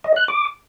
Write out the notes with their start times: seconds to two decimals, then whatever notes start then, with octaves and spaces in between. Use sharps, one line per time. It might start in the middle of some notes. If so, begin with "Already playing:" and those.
0.04 D#5
0.16 F#6
0.28 D6